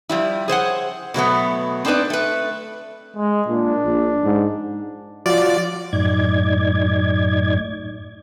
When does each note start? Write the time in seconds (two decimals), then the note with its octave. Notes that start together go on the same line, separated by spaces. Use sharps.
0.09 F3 G3 E4
0.48 G#4 C5 C#5 F#5
1.14 B2 F#3 A3 B3
1.85 C4 D4 D#4 A4 B4 D5
2.10 A3 B4
3.16 G#3
3.48 A#2 D4
3.84 A#1
4.24 G#2
5.26 F3 F4 F#4 D5
5.93 F#2 A2 D#4 D5 G#6